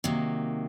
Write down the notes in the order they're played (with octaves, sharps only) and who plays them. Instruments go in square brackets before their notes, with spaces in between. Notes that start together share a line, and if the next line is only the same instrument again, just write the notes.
[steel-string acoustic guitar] C3 D#3 F#3 A#3